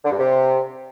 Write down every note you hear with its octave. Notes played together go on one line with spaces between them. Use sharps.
D3
G2
C3